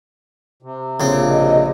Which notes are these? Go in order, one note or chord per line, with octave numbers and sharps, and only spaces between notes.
C3
A#1 C#3 C4
D#5